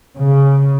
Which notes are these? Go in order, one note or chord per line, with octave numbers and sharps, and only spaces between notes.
C#3